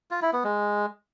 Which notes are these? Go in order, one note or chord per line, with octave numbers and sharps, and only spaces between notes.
F4
E4
B3
G#3